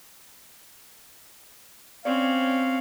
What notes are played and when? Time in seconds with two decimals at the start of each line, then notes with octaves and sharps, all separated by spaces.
2.05 C4 C#4 D5 F5